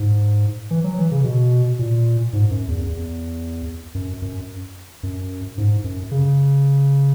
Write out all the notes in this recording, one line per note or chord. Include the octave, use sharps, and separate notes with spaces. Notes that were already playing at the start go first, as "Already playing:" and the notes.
Already playing: G#2
E3
F#3
E3
C#3
B2
A#2
G#2
F#2
E2
E2
F#2
F#2
F#2
G#2
F#2
C#3